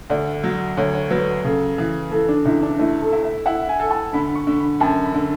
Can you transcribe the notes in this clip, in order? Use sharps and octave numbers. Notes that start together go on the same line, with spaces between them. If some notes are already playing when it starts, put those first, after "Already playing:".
D2 D5
F#3
D2 C#5
C#5
F#3 B4
C#3 A4
E3
E3 A4
D4
C#2 E4
D4
A3 E4
A4
E4
E5
E4 F#5
G#5
A4
A5
D3 B5
C#6
D3
B5
F#2 A5
B5
D3